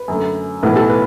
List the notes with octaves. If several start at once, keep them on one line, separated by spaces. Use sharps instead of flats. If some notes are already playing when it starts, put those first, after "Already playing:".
Already playing: B4
F#2 D3 A3
B1 A2 E3 B3 B4
A4
B4